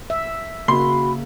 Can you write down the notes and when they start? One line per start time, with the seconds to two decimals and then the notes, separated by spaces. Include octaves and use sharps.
0.10 E5
0.68 C#3 A#3 F#4 B5 C6